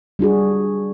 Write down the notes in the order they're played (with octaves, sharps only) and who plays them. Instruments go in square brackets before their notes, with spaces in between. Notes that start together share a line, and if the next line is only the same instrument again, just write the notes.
[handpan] G3 D4 F#4 G#4